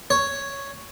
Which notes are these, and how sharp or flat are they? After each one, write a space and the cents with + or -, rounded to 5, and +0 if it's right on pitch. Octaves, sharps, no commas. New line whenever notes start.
C#5 +0